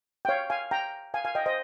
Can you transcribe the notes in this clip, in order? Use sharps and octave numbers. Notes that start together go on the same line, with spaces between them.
G5
C#5 F5
F5 G#5
G5 A#5
F5 G#5
F5 G#5
D#5 G5
C5 D#5